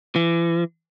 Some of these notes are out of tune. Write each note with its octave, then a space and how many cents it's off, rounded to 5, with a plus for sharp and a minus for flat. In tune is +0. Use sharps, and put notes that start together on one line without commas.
E3 +35